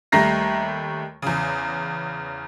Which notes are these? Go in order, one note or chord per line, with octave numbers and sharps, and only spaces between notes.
D#2 G3 A3 A#5 A#6 C7
E2 C#3